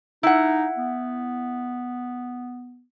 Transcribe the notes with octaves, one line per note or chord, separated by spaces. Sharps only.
D#4 E4 F#5
B3